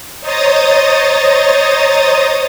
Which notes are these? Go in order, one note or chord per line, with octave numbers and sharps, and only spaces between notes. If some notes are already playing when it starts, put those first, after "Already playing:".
C5 C#5 D#5 A#5 D#6 A6